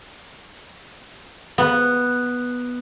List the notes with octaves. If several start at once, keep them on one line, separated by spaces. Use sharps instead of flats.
B3